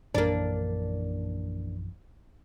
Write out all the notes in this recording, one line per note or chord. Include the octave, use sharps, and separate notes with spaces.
A#1 F#2 E3 A#3 D4